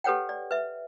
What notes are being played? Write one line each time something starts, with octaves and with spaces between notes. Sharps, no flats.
G4 A4 B4 C#5 F#5 G5
D5
B4 E5